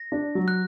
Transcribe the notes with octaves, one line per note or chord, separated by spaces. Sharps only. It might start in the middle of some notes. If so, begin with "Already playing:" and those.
Already playing: A#6
D4
F#3
F#6